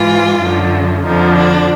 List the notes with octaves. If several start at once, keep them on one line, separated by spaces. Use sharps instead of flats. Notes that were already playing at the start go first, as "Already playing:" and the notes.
Already playing: G#2 E3 F4
F#2 D3 F3
F2 D3 F3 D#4
D4